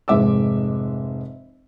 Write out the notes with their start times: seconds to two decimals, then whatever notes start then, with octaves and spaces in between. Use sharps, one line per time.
0.08 F1 G#2 G#3 E5 D6 E6